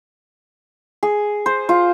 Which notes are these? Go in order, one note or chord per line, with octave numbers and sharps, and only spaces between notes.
G#4
C5
F4